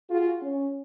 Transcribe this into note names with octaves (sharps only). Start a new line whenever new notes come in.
F4 F#4 G#4
C#4